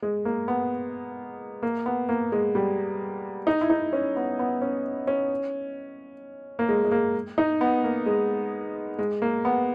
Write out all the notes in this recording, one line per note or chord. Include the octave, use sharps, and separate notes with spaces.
G#3
A#3
B3
A#3
B3
A#3
G#3
G3
D#4
E4
D#4
C#4
B3
B3
C#4
C#4
A#3
G#3
G#3
A#3
D#4
B3
A#3
G#3
G#3
A#3
B3